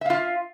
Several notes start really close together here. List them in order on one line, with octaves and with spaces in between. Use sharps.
E5 F5 F4